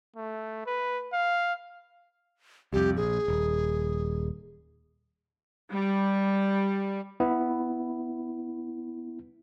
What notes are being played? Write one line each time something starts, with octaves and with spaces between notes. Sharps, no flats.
A3
B4
F5
C2 F2 G4
A#1 G#4
D#1
G3
B3 E4